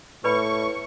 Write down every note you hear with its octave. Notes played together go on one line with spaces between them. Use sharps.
A2 B4 D5 B5 C#6